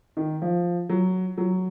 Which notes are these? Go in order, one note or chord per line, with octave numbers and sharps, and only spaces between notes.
D#3
F3
F#3
F#3